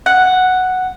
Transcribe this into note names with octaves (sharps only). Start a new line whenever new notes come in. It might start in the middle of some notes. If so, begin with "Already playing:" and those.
F#5